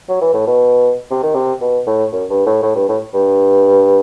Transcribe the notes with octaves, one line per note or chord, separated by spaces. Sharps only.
F#3
E3
A2
B2
C3
D#3
C3
B2
A2
F#2
G2
A2
A2
G2
A2
G2